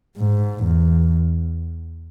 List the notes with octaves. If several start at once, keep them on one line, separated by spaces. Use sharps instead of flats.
G#2
E2